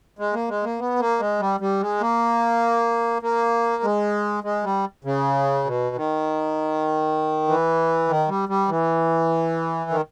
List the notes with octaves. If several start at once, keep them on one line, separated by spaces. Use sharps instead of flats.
G#3
A#3
G#3
A#3
B3
A#3
G#3
G3
G3
G#3
A#3
A#3
G#3
G#3
G3
C#3
B2
D#3
E3
D#3
G3
G3
E3
D#3